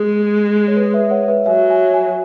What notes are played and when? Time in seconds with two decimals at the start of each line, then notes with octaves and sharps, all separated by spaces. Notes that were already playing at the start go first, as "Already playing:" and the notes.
Already playing: G#3 G#4
0.68 C#5
0.76 B4
0.94 B4 E5
1.11 C#5 F#5
1.28 B4 E5
1.46 F#3 E5 G#5
1.70 E5 G#5
1.93 E5 G#5